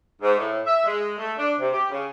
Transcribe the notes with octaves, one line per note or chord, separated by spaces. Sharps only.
G#2
A2
E5
G#3
A3
D4
C3
G4
C#3